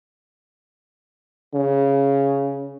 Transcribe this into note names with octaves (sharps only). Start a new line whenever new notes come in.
C#3